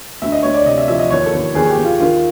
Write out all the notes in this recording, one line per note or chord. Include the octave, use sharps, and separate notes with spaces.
D2 E5
D#5
D2 C#5
D5
C3 D#5
E5
F3 E5
D#5
D#2 C#5
A4
D#2
D#2 G#4
G4
D#2
F4
D#3 F4